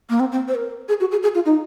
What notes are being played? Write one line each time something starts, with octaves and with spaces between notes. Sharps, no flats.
A#3
C4
C4
C5
A#4
G#4
F#4
G#4
G#4
F4
D#4